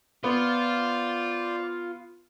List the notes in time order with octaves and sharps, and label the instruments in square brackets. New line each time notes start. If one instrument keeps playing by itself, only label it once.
[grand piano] B3 [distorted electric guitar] F4 [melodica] C5 D5